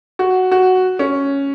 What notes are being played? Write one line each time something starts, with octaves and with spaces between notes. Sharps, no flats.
F#4
F#4
C#4